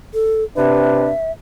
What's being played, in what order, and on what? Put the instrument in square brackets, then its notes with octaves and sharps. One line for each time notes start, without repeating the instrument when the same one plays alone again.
[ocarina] A4
[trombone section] C3 D4 B4 [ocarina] E5